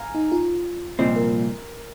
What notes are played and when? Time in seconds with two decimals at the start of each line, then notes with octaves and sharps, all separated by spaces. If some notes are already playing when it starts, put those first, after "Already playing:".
Already playing: F5 G#5 A#5
0.15 D#4
0.32 F4
0.99 C2 A#2 F3 C4 D#5
1.16 A#4